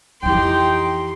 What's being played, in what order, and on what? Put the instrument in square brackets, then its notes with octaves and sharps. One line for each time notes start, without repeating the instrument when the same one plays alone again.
[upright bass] F2 E3 [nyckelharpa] D#4 G4 [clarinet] G5 [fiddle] C6